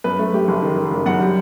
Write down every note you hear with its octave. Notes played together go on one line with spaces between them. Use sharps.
F#2 B4
A3
A3 G4
F#1
D#3
D#3
F#1
F#2 F#5
G3